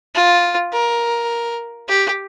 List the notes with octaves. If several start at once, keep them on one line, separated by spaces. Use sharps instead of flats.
F4
A#4
G4